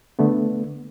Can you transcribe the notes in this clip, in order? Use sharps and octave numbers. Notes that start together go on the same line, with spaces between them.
D3 A3 B3